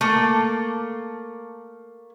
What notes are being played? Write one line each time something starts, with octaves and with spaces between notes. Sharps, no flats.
A3 A#3